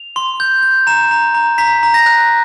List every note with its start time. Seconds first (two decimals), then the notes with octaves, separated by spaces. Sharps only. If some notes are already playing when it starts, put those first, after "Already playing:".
Already playing: F7
0.16 C6
0.40 G6
0.63 G6
0.87 A#5 E7
1.11 A#5
1.35 A#5
1.58 A#5 B6
1.83 A#5
1.94 A#6
2.06 F#6